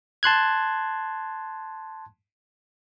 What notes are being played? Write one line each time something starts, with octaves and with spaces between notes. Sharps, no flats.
A5 C6 F#6 G#6